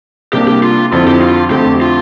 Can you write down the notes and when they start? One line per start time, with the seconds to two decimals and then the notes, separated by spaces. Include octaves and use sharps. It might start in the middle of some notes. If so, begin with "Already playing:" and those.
0.33 C3 G3 A#3 D4 G4
0.47 G4
0.63 F4
0.92 F2 D3 F3 C4 E4 F4
1.07 G4
1.21 F4
1.51 F2 D3 F3 A3 C4 G4
1.81 F4